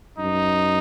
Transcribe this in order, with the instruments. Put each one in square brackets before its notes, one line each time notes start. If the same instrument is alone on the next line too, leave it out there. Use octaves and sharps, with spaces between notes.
[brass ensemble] F#2 D#4